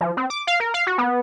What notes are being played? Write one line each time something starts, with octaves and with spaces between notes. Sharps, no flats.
F3
C4
D6
F5
A#4
F5
F#4
B3